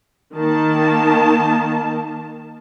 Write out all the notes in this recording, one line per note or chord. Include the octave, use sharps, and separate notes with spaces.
D#3 A#3 A5